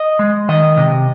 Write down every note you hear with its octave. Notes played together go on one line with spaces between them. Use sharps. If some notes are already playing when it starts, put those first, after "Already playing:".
Already playing: D#5
G#3
D#3 D#5
C3